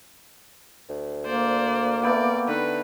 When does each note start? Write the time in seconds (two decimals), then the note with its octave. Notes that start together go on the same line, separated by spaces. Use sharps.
0.89 D2
1.25 A#3 C5 D5
2.03 A3 B3 D5 G5
2.48 D3 D#4 B4